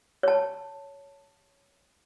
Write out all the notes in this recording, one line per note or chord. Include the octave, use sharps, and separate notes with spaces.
C#5 A5